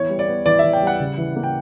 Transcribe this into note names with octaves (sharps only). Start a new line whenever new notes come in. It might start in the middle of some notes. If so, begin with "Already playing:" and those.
Already playing: E3 B3 C#5
G3
D5
B3
E3 D5
E5
E3
G5
G3
F#5
C#3
E3
A#3
G5